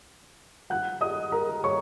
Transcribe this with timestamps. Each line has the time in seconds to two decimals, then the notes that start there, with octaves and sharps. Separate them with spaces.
0.70 F#5 F#6
1.01 D#5 D#6
1.32 A#4 A#5
1.64 C#5 C#6